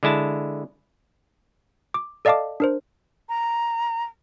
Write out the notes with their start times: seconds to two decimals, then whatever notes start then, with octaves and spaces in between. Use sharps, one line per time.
0.03 D3 G#3 E4 A5
1.94 D6
2.25 A4 D5 D#5 F5 A5 D6
2.60 D4 A#4 C5
3.29 A#5